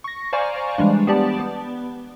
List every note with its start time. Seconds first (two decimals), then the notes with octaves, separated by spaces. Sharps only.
0.04 C#6 A#6
0.33 C5 D5 F5 G#5 A#5 C#6
0.78 E3 G3 G#3 D4
1.07 B3 G4 D5 A5
1.39 B3